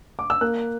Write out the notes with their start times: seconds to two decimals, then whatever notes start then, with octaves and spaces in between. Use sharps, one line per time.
0.19 D6
0.30 E6
0.41 A#3 F#6